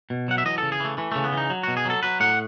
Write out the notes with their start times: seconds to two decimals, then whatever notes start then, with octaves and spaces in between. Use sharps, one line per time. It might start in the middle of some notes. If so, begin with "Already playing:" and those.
0.10 B2
0.28 F#3 F#5
0.38 E5
0.45 E3 D#5
0.58 C#3 A4
0.72 G#4
0.80 E3 A3
0.98 E3 A3
1.12 C#3 A3
1.24 B3
1.33 E3 D#4
1.50 F#3
1.63 B2 F#4
1.77 G#4
1.86 F#3 A4
2.03 F#3 B4
2.20 A2 F#5